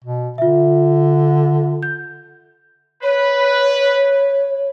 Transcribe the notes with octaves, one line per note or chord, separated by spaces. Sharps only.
B2
D3 F4 E5
G6
B4 C#5